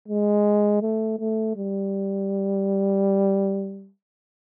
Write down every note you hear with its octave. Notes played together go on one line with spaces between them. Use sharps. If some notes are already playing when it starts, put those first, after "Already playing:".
G#3
A3
A3
G3